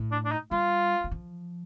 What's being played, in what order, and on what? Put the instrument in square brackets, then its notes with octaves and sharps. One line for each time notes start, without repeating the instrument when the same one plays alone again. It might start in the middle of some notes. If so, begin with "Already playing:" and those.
Already playing: [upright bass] A2
[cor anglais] D4
D4
D#4
[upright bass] G3 [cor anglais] F4
[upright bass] G3
F3